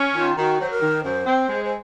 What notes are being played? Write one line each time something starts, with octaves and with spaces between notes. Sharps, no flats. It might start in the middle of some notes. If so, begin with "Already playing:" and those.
Already playing: C#4
D#3 F4
D#3 F#4
F#3 C5
A#4
D#3
F#2 C5
C4
G#3
C5